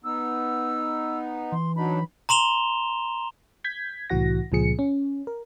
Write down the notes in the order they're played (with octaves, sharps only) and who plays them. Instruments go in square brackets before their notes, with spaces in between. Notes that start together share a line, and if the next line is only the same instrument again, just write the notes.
[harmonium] B3 D#4 [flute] E6
[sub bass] E3 [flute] C6
[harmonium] F#3 D4 D#4 [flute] B5
[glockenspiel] A#5 C6 E7 F7 G7
[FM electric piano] G6 G#6 B6
C2 A2 E3 F#4 F#5 A#6
C#2 A#2 F3 G#4 C#7
C#4
A#4